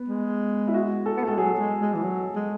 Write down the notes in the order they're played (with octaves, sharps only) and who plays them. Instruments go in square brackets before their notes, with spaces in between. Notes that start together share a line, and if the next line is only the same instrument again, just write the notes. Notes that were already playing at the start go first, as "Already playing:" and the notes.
Already playing: [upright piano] B3
[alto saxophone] G#3
[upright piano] E4
F#4
A4
[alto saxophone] B3
A3
[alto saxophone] G#3 [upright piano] A4
[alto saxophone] F#3 [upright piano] G#4
[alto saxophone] G#3
G#3
E3
F#3
G#3